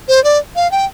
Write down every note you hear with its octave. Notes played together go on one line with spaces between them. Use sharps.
C5
D5
F5
G5